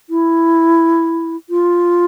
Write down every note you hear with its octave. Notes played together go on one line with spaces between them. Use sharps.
E4
F4